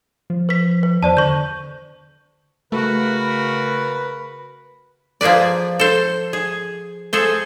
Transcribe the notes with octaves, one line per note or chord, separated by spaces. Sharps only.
F3
B4 B6
B4
E2 C5 D5 A5
D3 C#6 G6
C#3 A3 F#4 A#4 B4
F3 A#3 G#4 B4 D5
A4 C5
G#4
G#4 A4 C5